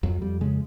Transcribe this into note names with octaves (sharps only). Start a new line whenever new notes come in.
F2 F#3
F2 G3
C#3 G#3